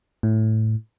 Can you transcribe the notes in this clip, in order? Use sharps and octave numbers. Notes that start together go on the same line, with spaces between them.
A2